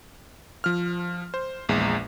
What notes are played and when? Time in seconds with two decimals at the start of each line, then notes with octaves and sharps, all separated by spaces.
0.64 F3 F6
1.34 C5
1.69 A#1 E2 G#3